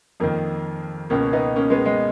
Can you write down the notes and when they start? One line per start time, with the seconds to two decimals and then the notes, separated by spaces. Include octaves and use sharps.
0.20 F2 D#3 A#3
1.10 C#2 B2 A#3 C#4
1.33 B3 D#4
1.56 A#3 C#4
1.70 G#3 B3
1.86 G#3